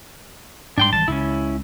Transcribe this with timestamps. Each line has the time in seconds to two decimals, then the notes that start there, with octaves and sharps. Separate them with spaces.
0.78 G#2 G3 D4 G5 C6
0.93 G#1 E3 G3 A5
1.08 C#2 C#3 C#4 E4